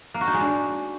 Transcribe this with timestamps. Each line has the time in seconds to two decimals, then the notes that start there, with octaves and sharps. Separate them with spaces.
0.14 A#3
0.21 F#4
0.27 D#4
0.34 G#3
0.40 D4